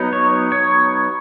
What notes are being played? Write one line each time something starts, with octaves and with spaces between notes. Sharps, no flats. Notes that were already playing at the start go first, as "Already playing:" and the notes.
Already playing: F#3 B3 D#4
C#5
C#5